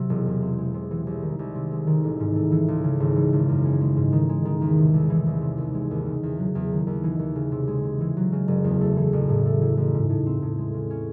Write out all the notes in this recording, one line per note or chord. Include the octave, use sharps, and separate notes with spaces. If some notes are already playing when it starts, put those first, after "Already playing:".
Already playing: C3 F#3
E1
E2
C4
G#3
C3
E3
C2
D#3
C2
C3
G#3
D#3
A1
G#2
A3
E3
C#2
C#3
G#1
E3
G#1
F#2
C#4
G#3
G#2
D#3
G#3
D#3
E2
C3
C2
E3
C2
C3
D#2
G#3
D#2
C#3
E2
F#3
E2
D#3
D#2
E3
D#2
C#3
C3
G#3
C3
E3
F#3
C#3
F#1
E2
A3
E3
A1
A2
A3
E3
A1
G#2
A2
C4
A2
G#3
C#3
C#4